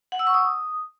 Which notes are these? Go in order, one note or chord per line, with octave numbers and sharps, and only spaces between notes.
F#5
E6
C#6
D#6